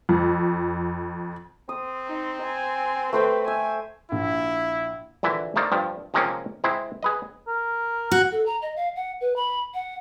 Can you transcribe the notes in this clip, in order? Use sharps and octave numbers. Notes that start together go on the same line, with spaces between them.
F2
C4 D#6
D#4
G#5
A3 B4 C5 G5
E5 G#5
A#1 E4
A#1 D3 E3 E4 E5
A3 A#3 D#4 C5 D5 F5
G2 F3
C3 F3 G#3 A#3 C4 C#4
G#3 C4 E4 C5 E5
G#4 B4 D#5
A#4
F#4 F#5
A4
A#5
D#5
F5
F#5
B4
B5
F#5